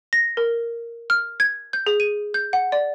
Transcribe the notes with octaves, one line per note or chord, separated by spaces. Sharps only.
A#6
A#4
F6
G#6
G6
G#4
D#7
G6
F#5
D5